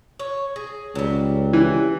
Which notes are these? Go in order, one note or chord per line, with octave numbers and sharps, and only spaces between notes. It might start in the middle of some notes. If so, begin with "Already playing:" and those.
C#5
G#4
C#2 F#3 G3
E3